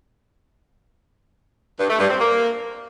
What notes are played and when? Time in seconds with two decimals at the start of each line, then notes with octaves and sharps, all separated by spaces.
1.78 G2
1.89 A3
1.99 G2
2.09 C4
2.20 A#3